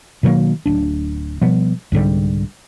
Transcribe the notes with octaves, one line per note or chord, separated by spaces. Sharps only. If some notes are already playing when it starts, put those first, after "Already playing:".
B2 D#3 F#3 A#3
D1 D4
B2 F3 G3 B3
C2 G#2 D3 G3